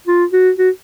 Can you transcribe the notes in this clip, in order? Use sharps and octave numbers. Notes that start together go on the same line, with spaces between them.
F4
F#4
F#4